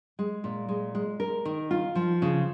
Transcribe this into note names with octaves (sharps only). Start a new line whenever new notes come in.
G#3
A#2
G#3
G#3
A#4
D#3
F4
F3
C#3